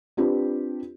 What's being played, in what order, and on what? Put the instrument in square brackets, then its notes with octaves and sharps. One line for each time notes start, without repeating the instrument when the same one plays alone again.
[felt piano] C4 D4 F4 G4 B4